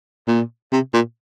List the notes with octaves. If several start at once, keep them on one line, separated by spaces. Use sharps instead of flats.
A#2
C3
A#2